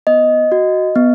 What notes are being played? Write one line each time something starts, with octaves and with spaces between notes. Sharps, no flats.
B3 D#5
F#4
B3